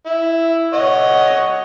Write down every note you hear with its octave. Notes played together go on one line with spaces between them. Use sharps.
E4
C#5 D#5 F#5